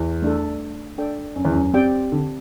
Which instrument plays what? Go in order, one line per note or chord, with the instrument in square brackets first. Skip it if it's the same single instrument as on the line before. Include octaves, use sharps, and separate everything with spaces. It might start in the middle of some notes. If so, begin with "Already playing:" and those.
Already playing: [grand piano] E2
[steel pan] A3 D4 A4
D4 A4 D5 G5
[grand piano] F#2
E2
F#2
[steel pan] C4 G4 D5 G5
[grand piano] D3